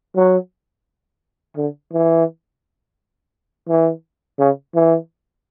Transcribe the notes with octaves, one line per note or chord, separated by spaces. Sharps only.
F#3
D3
E3
E3
C#3
E3